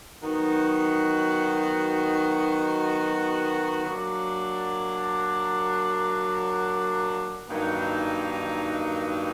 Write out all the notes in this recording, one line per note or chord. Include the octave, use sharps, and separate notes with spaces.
D#3 F#3 B3 D#4 F#4
F#3 A#3 D4
G2 D#3 F#3 A#3 D#4